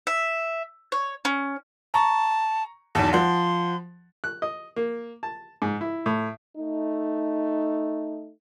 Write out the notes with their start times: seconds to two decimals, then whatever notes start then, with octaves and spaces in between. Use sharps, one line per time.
0.07 E5
0.92 C#5
1.25 C#4
1.94 A5 A#5 C#6
2.95 B1 E2 A5
3.13 F3 F#5 C6
4.24 F#6
4.42 D#5
4.76 A#3
5.23 A5
5.62 G#2
5.81 E4
6.06 A2
6.56 A3 D#4